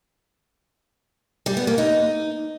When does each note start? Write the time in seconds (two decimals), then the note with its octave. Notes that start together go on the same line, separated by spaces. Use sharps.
1.46 G3
1.57 B3
1.67 A#3
1.78 D#4